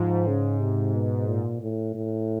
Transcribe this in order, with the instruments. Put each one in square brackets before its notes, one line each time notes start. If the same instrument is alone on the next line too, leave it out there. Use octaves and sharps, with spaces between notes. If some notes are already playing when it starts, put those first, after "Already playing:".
Already playing: [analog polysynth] G#2 [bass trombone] F3
[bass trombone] C#3
C3
B2
A#2
A2
A2